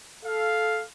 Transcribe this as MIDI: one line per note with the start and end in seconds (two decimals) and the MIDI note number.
0.24 0.81 69
0.24 0.81 77